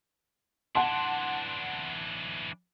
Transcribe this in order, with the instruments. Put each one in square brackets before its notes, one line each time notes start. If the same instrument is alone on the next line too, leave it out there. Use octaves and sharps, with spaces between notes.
[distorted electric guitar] E3 D4 [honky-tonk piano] F#5 A5 C6